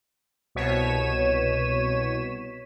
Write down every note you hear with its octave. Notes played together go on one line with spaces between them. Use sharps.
C2 B2 C#5 B6 D#7 E7